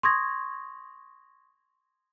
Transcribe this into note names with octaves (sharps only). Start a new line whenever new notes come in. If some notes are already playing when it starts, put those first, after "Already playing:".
C6 C#6 D#6 G#6 A#6